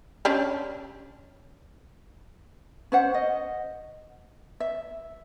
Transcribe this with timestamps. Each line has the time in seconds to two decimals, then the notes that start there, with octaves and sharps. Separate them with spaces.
0.25 C#4 D4 G4
2.92 C#4 C5 F#5
3.14 D#5
4.60 E5